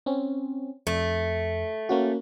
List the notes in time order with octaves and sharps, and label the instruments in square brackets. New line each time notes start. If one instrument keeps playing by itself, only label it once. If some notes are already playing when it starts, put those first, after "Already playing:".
[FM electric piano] C4 C#4
[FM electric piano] F2 [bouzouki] A3
[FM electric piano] A#3 C#4 F#4